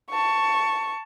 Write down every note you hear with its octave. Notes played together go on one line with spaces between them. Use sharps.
A5 C#6